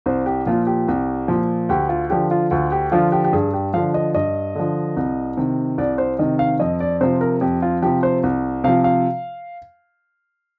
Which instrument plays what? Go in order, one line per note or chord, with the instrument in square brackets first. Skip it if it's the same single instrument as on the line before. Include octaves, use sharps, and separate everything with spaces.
[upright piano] C2 C5
G4
A#2 F3 F4
G4
C2
A#2 F3
D2 G4
F4
D3 F3 G4
F4
D2 F4
G4
D3 F3 F4
G4
G4
G2 G#4
G4
D3 F3 F5
D#5
G2 D#5
D3 F3
C2
C3 D#3
C2 D5
C5
C3 D#3 D#5
F5
F2 D#5
D5
C3 F3 C5
A#4
F2 G4
F4
C3 F3 G4
C5
C2
C3 F3 F5
F5